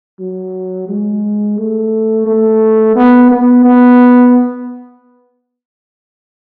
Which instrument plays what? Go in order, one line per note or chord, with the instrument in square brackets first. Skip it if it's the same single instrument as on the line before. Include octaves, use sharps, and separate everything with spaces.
[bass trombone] F#3
G#3
A3
A3
B3
B3
B3